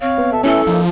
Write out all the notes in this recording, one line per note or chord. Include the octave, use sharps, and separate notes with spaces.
C4 C#5 F5
B3
B2 A4 E5
E3 A3 C#4 E4 A4
F3 A#3 D#4